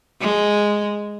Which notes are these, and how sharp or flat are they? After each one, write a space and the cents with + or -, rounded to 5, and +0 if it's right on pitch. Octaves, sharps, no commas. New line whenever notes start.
G#3 -5